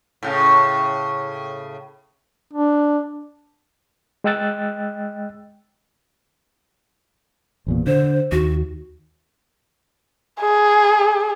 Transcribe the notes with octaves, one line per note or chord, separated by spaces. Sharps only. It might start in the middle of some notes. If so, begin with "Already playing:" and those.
A2 C#3
D4
G#3 D#5 G5 E6 F#6 A6
G#1 E2 A#2
D3 C5
D#2 F#4
G#4